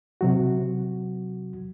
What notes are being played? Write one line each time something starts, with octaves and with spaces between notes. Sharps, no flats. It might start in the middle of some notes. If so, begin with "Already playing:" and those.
C3 F#3 F#4